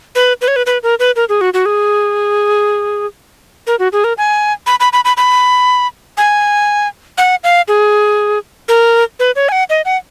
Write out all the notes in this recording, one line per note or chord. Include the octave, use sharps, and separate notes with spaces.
B4
B4
C#5
B4
B4
A#4
B4
A#4
G#4
F#4
F#4
G#4
A#4
F#4
G#4
A#4
G#5
B5
B5
B5
B5
B5
G#5
F#5
F5
G#4
A#4
B4
C#5
G#5
F#5
D#5
F#5